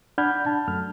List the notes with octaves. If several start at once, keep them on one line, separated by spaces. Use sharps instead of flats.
D4 F#5 B5 F6 G6 G#6
A5
F#2 A3 F6